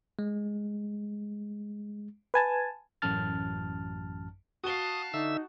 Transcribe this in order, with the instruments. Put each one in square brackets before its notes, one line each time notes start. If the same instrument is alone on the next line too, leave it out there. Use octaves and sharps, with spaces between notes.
[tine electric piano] G#3
[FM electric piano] B4 G#5 A5
[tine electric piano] A1 F#2 A5 F6 A6
[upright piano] F#4 G7 [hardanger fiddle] F5 A5 [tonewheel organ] D#6
[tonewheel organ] D3 E5 E6 [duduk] D#4